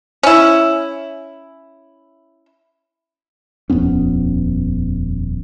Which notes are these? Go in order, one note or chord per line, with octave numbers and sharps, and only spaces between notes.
C#4 E4
D#1 F2 B3 C#4